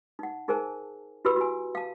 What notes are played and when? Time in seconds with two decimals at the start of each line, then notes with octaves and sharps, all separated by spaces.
0.19 D#4 F#5
0.48 D#4 G#4 A#4 C5 G#5 A5
1.25 E4 F#4 G4 B4 B5 E6
1.36 F#4 G#5
1.75 F5 A5